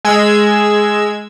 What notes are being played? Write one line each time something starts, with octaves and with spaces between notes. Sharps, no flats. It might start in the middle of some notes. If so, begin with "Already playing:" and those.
G#3 E6 G#6